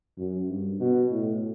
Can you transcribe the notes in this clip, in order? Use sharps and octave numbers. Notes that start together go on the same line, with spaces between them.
F#2
G2
B2
A2